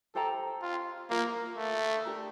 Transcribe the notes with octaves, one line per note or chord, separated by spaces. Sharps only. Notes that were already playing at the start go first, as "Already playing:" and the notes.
G4 A4 C5 G5 A#5
F4
A#3 F4 A#4 F5
A3
D4 G4 A#4